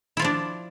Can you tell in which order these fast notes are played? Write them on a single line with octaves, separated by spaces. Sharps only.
E4 F4 F3 D4